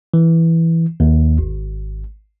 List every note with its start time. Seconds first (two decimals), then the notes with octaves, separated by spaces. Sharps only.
0.14 E3
1.00 D#2
1.38 G#1